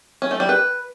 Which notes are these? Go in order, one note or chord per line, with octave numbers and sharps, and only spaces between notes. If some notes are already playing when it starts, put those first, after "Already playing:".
C#4
A3
G3
B4